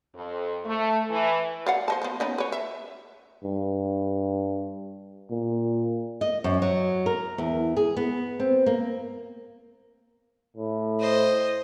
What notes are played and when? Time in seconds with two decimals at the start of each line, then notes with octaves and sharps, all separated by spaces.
0.15 F2
0.66 A3
1.10 E3
1.66 D5 F5 F#5
1.88 C5 D#5 A5
2.02 F3 B3
2.20 B3 C#4 D#4
2.38 B4 C#5
2.52 E5
3.44 G2
5.30 A#2
6.21 D#5
6.44 F#2
6.62 F#3
7.06 A#4
7.38 E2
7.77 G#4
7.97 B3
8.40 C4
8.66 A#3
10.57 A2
11.00 C5 D#5